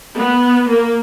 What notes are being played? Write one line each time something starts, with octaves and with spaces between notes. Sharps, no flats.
B3
A#3